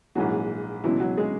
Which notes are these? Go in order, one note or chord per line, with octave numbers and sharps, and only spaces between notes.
A#1 G#2 E3 F#3 F#4
C#2 B2 E3 F#3 E4
F#3 F#4
G#3 G#4